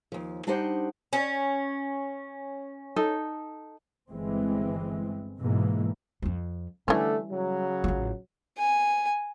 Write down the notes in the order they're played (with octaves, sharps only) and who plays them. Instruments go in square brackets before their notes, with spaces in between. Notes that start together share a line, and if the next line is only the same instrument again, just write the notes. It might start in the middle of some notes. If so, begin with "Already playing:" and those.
[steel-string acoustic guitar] D#2 F3
G3 D4 D#4 G4 C5 F#5
[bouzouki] C#4
[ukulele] D#4 A4
[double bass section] G1 E3 G#3 C4
G#2 B2 E3 G#3 A#3
[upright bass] F2 F3
[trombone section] D3 A3 [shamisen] E3 C#4 [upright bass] G3
[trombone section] C#3 F#3
[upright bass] A1 F4
[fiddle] G#5